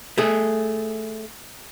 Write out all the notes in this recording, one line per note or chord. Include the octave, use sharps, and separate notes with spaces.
A3 G#4